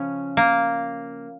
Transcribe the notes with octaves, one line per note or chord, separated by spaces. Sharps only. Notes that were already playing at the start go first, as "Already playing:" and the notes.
Already playing: C#3 F3 C#4
A#3